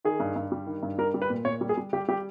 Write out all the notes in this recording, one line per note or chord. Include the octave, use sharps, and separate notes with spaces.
D#3 G#4
G2
G2
G3
D#3
G2
G3 A#4
G3
B4
A#2
A#2 C#5
G3
G#4
G3
G3 G4
G3 G4